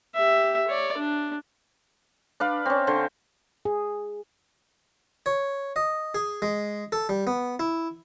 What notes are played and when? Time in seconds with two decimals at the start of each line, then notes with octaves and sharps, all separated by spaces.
0.15 G4 E5
0.68 C#5 D5
0.97 D4
2.40 D4 B4 F5
2.66 C4 C#4
2.87 D3 C5
3.65 G#4
5.26 C#5
5.76 D#5
6.15 G#4
6.42 G#3
6.92 A4
7.09 G3
7.27 B3
7.60 E4